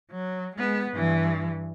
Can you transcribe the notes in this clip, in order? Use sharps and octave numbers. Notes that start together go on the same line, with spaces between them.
F#3
G#3 B3
G2 E3